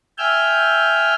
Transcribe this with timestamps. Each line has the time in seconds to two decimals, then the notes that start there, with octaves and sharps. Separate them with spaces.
0.18 E5 G5 G#5 E6 F6 G6